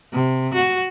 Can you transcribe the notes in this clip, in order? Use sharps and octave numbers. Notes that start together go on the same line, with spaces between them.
C3
F#4